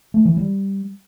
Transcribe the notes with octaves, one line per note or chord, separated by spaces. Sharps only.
A3
E3
G3